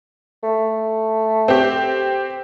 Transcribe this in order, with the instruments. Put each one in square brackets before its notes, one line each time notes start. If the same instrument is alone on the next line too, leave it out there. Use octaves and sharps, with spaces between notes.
[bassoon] A3
[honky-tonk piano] C4 G4